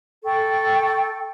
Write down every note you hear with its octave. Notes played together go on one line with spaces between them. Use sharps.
A4 G5 C#6